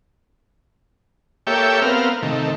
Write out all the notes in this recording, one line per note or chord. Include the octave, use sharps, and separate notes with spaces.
A#3 G4 A4 C#5 E5 G5
B3 C4 A#4 F5
C3 D#3 A3